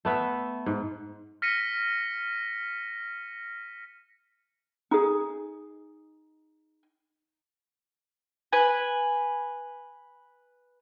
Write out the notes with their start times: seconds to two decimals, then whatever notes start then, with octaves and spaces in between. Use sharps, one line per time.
0.05 A3 B3 E5
0.66 G#2
1.42 F6 A#6 B6 C#7 D#7
4.91 D#4 G#4
8.53 B4 G#5